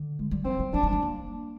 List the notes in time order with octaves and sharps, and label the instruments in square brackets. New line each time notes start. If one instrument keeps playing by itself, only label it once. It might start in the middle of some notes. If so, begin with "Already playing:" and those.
Already playing: [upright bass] D3
G#3
G3
[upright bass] F3 [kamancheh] C4
[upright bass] G3
[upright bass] G3 [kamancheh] D4
[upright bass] G3
G#3
A#3